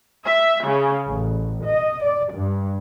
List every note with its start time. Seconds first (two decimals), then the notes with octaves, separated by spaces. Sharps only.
0.25 E5
0.64 C#3
1.06 A1
1.65 D#5
2.03 D5
2.33 G2